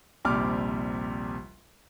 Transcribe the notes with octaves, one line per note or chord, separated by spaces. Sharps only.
A#1 D#2 C3 G3 D6 F6